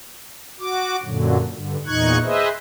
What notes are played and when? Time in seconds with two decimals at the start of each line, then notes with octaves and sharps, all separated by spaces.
0.60 F#4 D6
1.03 F#2 A#2 D3 F#3
1.53 G2 D3
1.86 E2 A#2 D#4 C#6 F#6 G#6
2.23 G#4 B4 C5 D#5 E5